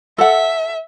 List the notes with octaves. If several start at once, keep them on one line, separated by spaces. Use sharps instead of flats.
A4 E5 F#5